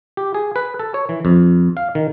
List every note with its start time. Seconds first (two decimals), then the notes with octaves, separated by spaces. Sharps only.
0.17 G4
0.34 G#4
0.56 B4
0.79 A4
0.94 C#5
1.09 E3
1.25 F2
1.77 F5
1.95 D#3